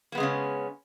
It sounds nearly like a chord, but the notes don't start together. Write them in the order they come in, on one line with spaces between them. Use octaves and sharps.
A#3 B3 G#3 C#3 C#4